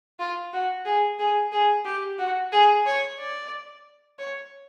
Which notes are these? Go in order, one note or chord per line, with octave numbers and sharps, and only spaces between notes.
F4
F#4
G#4
G#4
G#4
G4
F#4
G#4
C#5
D5
C#5